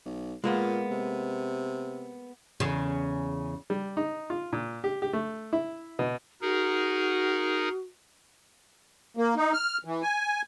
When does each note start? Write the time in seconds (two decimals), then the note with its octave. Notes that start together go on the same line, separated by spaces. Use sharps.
0.06 B1
0.44 A#2 G#3 A#3 B3
0.91 C3
2.60 E2 C#3
3.70 G3
3.97 D#4
4.30 F4
4.53 A#2
4.84 G4
5.02 G4
5.13 A3
5.53 E4
5.99 B2
6.41 D#4 F#4 G#4 A#4
9.17 A#3
9.36 D#4
9.53 F6
9.85 E3
10.02 G#5